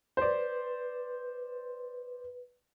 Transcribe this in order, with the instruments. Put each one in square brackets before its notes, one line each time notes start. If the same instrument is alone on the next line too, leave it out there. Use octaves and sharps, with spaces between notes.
[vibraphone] B4 [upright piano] C5 D5